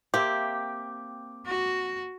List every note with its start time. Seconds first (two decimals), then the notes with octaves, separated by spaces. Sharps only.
0.14 A#3 C4 G4 E5 D6
1.46 F#4